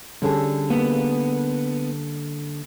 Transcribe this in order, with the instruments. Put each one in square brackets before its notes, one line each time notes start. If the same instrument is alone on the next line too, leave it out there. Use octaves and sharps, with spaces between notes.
[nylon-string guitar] D3 G#4 [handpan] G3 C#4 A4
[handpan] A#3 [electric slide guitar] B3